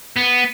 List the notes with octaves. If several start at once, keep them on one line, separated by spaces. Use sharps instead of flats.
B3